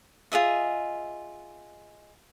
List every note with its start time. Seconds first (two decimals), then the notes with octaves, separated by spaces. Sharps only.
0.32 F4 G#4 D#5 E5